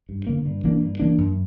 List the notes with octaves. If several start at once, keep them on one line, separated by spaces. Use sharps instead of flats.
G2
D3 A#3
G2
E3 A#3 D4
G2
E3 A#3 D4
F#2